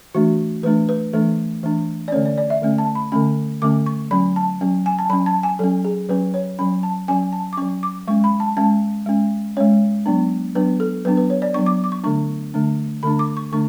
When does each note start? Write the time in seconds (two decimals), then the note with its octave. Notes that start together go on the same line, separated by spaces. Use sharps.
0.15 E3 A3 D4 F#4
0.63 E3 A3 D4 B4
0.89 B4
1.13 E3 A3 D4 A4
1.63 E3 A3 D4
2.08 D5
2.12 D3 A3 C#4 C#5
2.25 D5
2.38 D5
2.50 E5
2.62 D3 A3 C#4
2.78 A5
2.95 B5
3.12 D3 A3 C#4 B5
3.62 D3 A3 C#4 D6
3.86 C#6
4.11 F#3 C#4 B5
4.36 A5
4.61 F#3 C#4
4.86 G#5
4.99 A5
5.10 F#3 C#4 B5
5.26 A5
5.43 G#5
5.59 F#3 C#4 A4
5.85 G#4
6.09 F#3 C#4 B4
6.34 C#5
6.59 F#3 C#4 B5
6.83 A5
7.08 F#3 C#4 G#5
7.33 A5
7.53 D6
7.57 F#3 C#4 C#6
7.83 D6
8.08 G#3 C#4 C#6
8.24 B5
8.40 A5
8.57 G#3 C#4 A5
9.06 G#3 C#4
9.57 G#3 C#4 C#5
10.06 F#3 B3 D4
10.55 F#3 B3 D4 B4
10.80 A4
11.05 F#3 B3 D4 B4
11.17 B4
11.30 C#5
11.42 D5
11.54 F#3 B3 D4 C#6
11.66 D6
11.84 D6
11.92 C#6
12.04 D3 A3 D4 C#6
12.54 D3 A3 D4
13.03 D3 A3 D4 B5
13.19 D6
13.37 C#6
13.52 D3 A3 D4 C#6